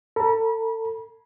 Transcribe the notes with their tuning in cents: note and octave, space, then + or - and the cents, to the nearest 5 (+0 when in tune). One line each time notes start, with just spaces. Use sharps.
A4 +35 B5 -40